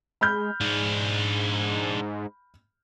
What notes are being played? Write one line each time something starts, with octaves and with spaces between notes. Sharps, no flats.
G#3 B5 F6 G6
G#2 D4 G#4